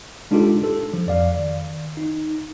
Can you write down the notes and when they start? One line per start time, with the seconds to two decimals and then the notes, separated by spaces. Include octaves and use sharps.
0.31 G#3 D4 D#4 F4 G4 A4
0.64 A4
0.93 F3
1.07 F2 D5 F5
1.37 D#3
1.97 D#4